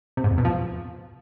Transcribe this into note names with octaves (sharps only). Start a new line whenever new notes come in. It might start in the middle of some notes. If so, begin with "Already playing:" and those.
C3
G#2
E2
B2
F3